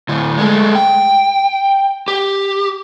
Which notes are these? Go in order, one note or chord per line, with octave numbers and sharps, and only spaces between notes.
D2 A2
G#3 A3
G5
G4